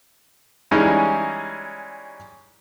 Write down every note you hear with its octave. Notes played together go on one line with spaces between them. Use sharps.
E3 G3 G#3 C#4 D#4